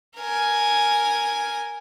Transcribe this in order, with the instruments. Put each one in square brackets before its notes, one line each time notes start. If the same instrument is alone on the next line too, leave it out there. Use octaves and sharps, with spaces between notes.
[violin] A#4 G#5